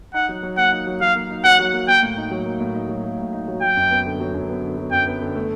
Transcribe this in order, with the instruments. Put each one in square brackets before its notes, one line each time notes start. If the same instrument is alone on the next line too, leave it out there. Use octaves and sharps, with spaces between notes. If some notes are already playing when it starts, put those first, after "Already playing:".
[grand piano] D#4 [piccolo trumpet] F#5
[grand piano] F#3
F#3
[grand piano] A#3 [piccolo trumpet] F#5
[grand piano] D#4
F#3
[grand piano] F#3 [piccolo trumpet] F5
[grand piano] A#3
D#4
[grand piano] F#3 [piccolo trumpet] F#5
[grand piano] F#3
A#3
[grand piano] A#3 [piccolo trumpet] G5
[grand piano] A2
D#4
F#3
A#3
A2
D#4
F#3
A#3
A2
D#4
F#3
[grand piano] F#3 [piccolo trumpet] G5
[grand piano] F#2
B3
D3
F#3
F#2
B3
D3
F#3
[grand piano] F#2 [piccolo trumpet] G5
[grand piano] B3
D3
A3